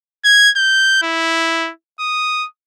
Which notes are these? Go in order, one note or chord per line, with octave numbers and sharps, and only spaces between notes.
G#6
G6
E4
D#6